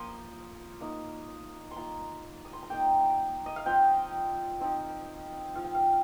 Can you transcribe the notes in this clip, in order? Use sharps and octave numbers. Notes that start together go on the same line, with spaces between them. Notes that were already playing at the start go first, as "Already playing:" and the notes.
Already playing: F3 A#3 F4 C6 D#6
A#3 D#4
C6
A#3 F4 A#5
D#6
C6
A#5
A#3 D#4 G5
D#5
F5
F3 C4 F4 G5
F3 C4 D#4
F3 C4 F4 F5
G5
F5